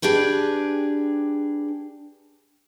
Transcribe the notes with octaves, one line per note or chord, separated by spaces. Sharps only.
D4 G4 G#4 B4